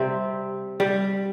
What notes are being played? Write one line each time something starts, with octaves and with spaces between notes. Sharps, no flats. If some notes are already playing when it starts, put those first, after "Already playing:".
Already playing: C3 G3 C4
G3